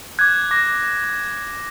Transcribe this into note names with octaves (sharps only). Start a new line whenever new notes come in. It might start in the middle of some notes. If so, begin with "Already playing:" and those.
D6 F#6 G#6
D6 F#6 A#6